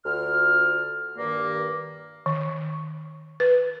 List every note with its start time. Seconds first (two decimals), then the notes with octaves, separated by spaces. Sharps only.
0.05 D2 D3 F4 D5 F6
1.17 G2 D#3 A#3 D5
2.26 D#3
3.40 B4